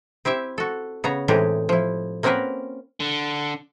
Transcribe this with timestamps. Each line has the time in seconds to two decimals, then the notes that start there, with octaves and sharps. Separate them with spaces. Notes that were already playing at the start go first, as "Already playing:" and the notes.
0.25 C4 E4 G4 E5
0.58 F#4 A4
1.04 C#3 B3 C#5 A#5
1.28 A2 C3 E3 G#3 D#4 G4
1.69 F3 E4
2.23 A#3 C4 C#4 F#4 A#4 B4
3.00 D3